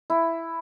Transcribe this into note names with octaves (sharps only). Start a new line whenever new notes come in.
E4